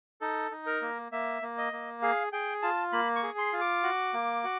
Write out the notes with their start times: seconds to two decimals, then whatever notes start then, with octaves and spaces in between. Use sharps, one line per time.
0.21 D#4 A4
0.51 D#4
0.66 A#4
0.82 A#3
1.12 A#3 E5
1.42 A#3
1.58 D#5
1.73 A#3
2.02 G#4 F5
2.33 G#4 G5
2.62 F4 A5
2.93 A#3 B5
3.16 C#6
3.23 G#4
3.38 C6
3.53 F4
3.61 D6
3.84 F#4
4.14 A#3
4.44 F#4